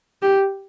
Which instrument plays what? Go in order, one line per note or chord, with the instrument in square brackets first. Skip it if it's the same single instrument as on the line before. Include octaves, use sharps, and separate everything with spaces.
[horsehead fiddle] G4